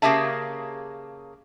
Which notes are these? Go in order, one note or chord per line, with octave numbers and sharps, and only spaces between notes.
C#3 A#3 G4 G#4 E5 A5